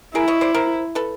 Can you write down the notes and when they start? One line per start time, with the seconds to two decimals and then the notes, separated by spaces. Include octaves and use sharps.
0.14 E4 G#4 A#4
0.28 C#5 D#5
0.41 C5 D5
0.54 A#4 C5
0.95 A4 B4